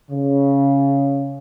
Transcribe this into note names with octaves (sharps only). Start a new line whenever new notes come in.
C#3